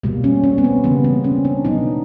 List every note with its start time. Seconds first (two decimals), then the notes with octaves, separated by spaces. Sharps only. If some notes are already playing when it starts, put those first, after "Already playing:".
0.03 B2 G3 A#3
0.24 C#4
0.43 C#4
0.58 B3
0.64 C4
0.84 C#3 E3 G3 A#3 B3
1.04 C4
1.24 C#4
1.45 D4
1.65 B2 F#3 B3 D#4